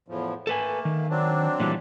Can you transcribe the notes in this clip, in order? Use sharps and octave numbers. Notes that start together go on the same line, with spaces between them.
E2 A2 F3
A3 A#3 A4 B4 G#5
D#3
F#3 C4 D4
A#2 E3 G3